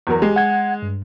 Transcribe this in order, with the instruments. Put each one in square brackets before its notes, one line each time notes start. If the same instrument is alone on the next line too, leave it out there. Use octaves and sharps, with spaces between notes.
[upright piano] E2 F#3 A#4
[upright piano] G#3 [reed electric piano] G4
[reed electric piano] F#5 G#6
G2